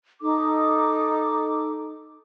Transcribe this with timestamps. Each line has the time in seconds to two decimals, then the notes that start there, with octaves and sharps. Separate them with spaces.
0.21 D#4 A4 D6